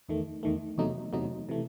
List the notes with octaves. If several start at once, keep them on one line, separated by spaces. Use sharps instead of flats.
E2 D#3 A3
E2 D#3 A3
E2 C3 F#3 A3 D#4
E2 C3 F#3 A3 D#4
C3 E3 A3